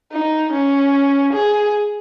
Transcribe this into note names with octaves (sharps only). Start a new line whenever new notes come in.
D#4
C#4
G#4